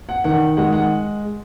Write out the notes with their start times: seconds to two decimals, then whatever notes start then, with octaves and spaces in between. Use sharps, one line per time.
0.09 F#5
0.24 D#3 F#5
0.57 G#3 F#5
0.73 F#5